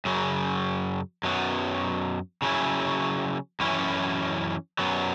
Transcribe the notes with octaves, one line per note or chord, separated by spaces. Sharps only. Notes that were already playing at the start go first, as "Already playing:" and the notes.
F#2 C#3 F#3
F#2 F#3 B3
C#3 F#3 C#4 E4
F#2 E3 C#4 E4
F#2 F#3 B3